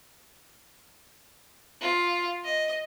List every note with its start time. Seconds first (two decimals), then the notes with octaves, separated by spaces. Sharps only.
1.81 F4
2.45 D#5